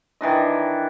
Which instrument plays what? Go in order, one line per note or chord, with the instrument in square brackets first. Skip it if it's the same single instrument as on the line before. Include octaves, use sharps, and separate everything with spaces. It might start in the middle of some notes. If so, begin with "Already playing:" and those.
[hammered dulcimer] D#3 E3 D4 D#5